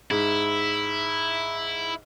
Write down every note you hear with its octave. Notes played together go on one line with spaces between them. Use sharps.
G#2 E4